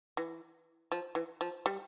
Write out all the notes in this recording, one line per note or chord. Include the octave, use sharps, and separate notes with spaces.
E3
F3
E3
F3
G3